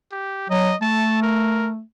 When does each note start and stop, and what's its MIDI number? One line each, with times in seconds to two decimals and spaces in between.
0.12 0.49 67
0.50 0.72 54
0.50 0.76 75
0.82 1.82 57
0.82 1.18 81
1.22 1.69 70